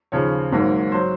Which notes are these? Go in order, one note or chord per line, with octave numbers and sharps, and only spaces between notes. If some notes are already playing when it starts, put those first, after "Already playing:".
D#2 C#3 F3 C#5
G#1 G#2 F#3 A#3
F#3 C5